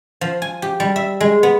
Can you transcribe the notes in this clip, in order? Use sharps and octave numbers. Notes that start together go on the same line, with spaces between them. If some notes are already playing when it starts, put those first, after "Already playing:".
F3
G#5
G4
G3
E5
G#3
B3